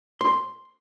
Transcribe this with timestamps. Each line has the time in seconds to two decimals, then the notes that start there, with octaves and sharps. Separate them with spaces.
0.21 C6